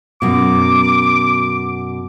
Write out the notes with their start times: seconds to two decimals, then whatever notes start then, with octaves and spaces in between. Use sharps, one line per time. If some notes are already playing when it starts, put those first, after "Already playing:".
0.22 F#2 B2 D6